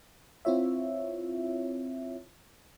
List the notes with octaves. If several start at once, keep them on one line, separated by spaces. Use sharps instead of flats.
C4 E4 F4 C#5 E5